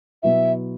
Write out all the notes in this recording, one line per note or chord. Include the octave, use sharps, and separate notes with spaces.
B2 F#3 B3 E4 E5